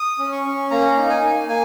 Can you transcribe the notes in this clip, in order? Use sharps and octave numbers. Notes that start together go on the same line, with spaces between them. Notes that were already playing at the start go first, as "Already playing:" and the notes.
Already playing: D#6
C#4
C#6
C#4
A#3 A#5
D#4
G#5
A#3
A#3 G#5